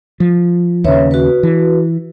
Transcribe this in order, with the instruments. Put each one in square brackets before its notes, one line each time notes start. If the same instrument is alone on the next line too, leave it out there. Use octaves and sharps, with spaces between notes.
[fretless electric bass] F3
[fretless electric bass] D#2 C#3 [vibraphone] B4 C#5 E5
[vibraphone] F#4 B4
[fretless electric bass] E3